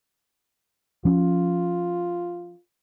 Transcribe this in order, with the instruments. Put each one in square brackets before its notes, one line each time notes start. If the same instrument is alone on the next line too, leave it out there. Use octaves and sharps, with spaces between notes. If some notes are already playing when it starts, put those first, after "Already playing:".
[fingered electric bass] F3 C#4 [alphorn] F4